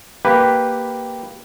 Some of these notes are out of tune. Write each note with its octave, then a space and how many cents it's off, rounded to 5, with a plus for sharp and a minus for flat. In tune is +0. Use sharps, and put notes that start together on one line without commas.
A#3 +0 G4 +0 B4 +0